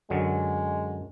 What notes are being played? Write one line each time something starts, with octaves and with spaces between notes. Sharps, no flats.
F#2 D3 F#3 G#3